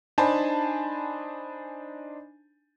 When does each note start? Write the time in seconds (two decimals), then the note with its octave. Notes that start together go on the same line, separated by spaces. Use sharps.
0.18 D4 D#4 C5 G#5 A5 B5